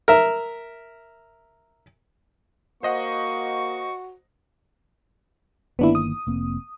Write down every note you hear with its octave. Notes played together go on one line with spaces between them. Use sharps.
A#4 E5
A#3 F#4 C5 D#5 F#5 C#6
G1 D#3 A#3 B3 D4 E4
D#6
F1 A#3 C4